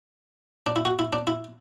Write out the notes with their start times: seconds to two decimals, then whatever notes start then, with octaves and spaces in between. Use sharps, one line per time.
0.66 D4
0.76 E4
0.85 F#4
0.99 E4
1.13 D4
1.27 E4